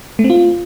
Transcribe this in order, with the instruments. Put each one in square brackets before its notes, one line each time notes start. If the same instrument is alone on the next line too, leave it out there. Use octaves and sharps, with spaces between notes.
[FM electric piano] A3
C4
F4